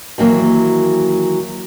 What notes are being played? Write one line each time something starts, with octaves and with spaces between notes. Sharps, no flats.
D#2 E3 F#3 A#3